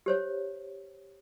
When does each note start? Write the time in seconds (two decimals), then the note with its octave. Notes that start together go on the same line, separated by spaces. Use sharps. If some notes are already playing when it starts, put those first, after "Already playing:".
0.06 G4 C5 C#5